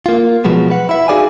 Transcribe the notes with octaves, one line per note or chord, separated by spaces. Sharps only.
A#3 F4
B2 F3 F#3 G#3 B3
B4 F#5
E4 E5
D#4 F#4 G#4 D5 F5 G#5